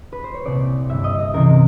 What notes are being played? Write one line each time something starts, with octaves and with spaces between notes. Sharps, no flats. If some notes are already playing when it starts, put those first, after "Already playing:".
B4
C5
C#5
C2 A#2 D5
G2 D3 E5
D#5
D#5
C#2 C3 E3 A#4